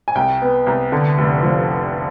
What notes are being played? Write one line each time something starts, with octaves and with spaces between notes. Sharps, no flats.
G#5
C2 G5
B3
C2
D3
F1
F3